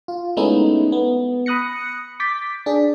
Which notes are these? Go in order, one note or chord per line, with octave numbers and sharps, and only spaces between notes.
F4
G#3 A3 B3 C#4 D#4 E4
B3
B5 D#6 F#6 A#6 C#7
D6 G6 A6 B6
D4 G#4